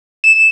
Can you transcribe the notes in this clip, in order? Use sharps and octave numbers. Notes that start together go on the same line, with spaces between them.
E7